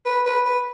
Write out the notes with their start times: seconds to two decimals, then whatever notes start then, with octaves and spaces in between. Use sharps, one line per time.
0.06 B4
0.26 B4
0.46 B4